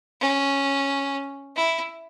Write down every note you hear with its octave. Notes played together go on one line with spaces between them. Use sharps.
C#4
E4